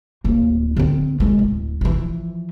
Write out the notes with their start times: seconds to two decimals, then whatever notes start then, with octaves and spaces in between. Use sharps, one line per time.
0.24 D1 A#3
0.77 D3 C4
1.20 G#3
1.39 D1
1.81 E3 F3